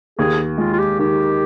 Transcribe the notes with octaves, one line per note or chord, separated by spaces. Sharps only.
D#2 G#4
G#3 F4
F4
G4
D#3 G4